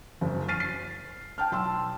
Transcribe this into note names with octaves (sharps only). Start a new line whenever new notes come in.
F#1 F#2
F6 A6 C7 D#7
C7
G5 A5 F6
B1 A5 C6 E6